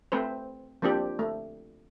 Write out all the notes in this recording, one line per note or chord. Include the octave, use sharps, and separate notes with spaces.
A3 C4 B4 C5
F3 A#3 C4 D4 G4
A3